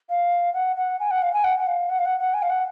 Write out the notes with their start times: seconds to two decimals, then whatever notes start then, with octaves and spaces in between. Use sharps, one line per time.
0.09 F5
0.54 F#5
0.76 F#5
1.00 G#5
1.11 F#5
1.22 F5
1.33 G#5
1.44 F#5
1.59 F#5
1.67 F5
1.90 F#5
1.98 F5
2.05 F#5
2.19 F#5
2.34 G#5
2.42 F5
2.50 F#5